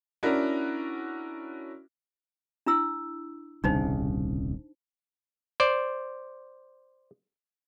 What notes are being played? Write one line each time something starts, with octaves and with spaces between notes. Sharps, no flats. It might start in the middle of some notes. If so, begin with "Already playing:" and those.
C#4 D4 E4 F#4 A#4
D4 E4 E6
D#1 C2 C#3 D4 D#4 C5
C5 D5